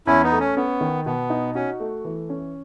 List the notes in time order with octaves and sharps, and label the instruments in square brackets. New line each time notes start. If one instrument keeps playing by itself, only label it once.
[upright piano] E2 [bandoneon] C#4 E4
[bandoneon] B3 D#4
[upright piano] A3
[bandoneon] C#4
[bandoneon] B3 [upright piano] C#4
[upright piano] D#3
[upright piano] B2 [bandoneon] B3
[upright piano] D#4
[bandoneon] C#4 [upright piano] F#4
[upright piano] A3
E3
C#4